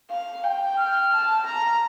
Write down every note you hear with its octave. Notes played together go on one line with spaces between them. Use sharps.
F5
G5
F6
A5
A#5